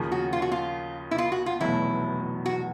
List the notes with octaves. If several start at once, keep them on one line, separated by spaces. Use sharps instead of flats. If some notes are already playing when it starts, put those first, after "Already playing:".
Already playing: D#2 C#3 F3 A#3
F#4
F4
F#4
F4
E4
F4
F#4
F4
F1 E2 B2 F#3 A3 E4
F#4